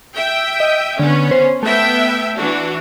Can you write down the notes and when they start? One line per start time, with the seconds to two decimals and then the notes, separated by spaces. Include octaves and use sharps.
0.14 E5 G5
0.60 D#5
0.99 D3 B3 C#4
1.31 C5
1.63 A3 B3 E5 G5
2.36 E3 D4 F#4